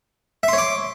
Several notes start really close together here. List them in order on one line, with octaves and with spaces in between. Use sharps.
E5 C6 C#5 D6